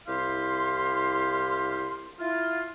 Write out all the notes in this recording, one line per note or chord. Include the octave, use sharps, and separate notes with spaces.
C2 E4 G4 F5 C6
E4 F4